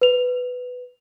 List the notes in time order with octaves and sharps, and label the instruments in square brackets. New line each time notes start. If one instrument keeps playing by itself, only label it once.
[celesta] B4 F7